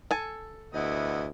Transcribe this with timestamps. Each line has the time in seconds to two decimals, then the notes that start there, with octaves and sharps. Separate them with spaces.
0.11 A4 G#5
0.74 D2 B3 E4 D#5